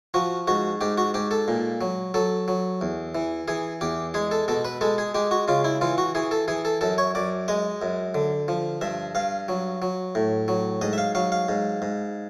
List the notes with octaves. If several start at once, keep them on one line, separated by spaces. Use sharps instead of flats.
F3 F#4
G#2 F#4
G#2 G4
F#4
G#2 G4
A4
A#2
F#3
F#3 A4
F#3
E2
E3
E3 G#4
E2 G4
G#3 G#4
A4
B2 A4
B4
G#3 A4
G#4
G#3 G4
F#4
C#3 F4
E4
E3 F4
F#4
E3 G#4
A4
E3 G#4
A4
F#2 A4
C#5
F#2 D5
G#3 D#5
F#2
D3
F3
G2 E5
G2 F5
F#3
F#3
A2
F#3
G#2 D#5
E5
F5
F#3 F5
F5
G#2
G#2